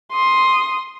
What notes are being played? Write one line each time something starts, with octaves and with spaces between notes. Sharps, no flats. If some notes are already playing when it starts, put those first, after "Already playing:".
C6 D#6